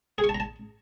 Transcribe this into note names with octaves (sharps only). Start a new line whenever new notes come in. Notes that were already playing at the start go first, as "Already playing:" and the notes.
G#4
C#6
A5
A#5
A5